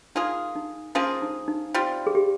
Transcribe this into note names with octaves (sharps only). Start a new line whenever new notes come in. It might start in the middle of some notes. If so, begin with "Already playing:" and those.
A#3 D#4 F4 G#4
D#4
F3 A#3 C#4 F4 G#4
D#4
D#4
G3 C4 F4
G#4
G4